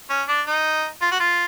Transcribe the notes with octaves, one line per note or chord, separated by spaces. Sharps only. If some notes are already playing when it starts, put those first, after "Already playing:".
C#4
D4
D#4
F4
F#4
F4